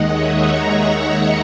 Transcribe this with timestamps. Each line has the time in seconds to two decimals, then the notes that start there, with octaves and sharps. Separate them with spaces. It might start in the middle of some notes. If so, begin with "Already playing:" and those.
Already playing: D#2 D#3 G#3 D#4 D#5 F#5
0.09 C#5 E5
0.39 A#5 C#6